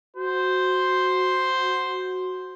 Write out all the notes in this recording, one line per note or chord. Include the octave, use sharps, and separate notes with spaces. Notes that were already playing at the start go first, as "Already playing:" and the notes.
F#4 C5